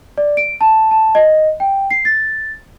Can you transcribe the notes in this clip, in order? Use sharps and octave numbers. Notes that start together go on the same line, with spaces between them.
D5
D7
A5
A5
D#5
G5
C7
A6